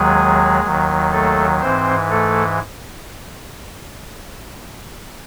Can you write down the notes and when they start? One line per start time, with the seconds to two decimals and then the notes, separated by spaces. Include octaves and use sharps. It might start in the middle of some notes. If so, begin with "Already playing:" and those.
Already playing: D#2 D#3 F#3 G#3 G#4
0.63 D#2 D#3 F#3
1.11 A3 A4
1.60 G#2 E3 C4 C5
2.09 A3 A4